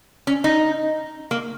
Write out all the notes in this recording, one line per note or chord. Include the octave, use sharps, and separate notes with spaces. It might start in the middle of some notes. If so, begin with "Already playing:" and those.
C#4
D#4
A#3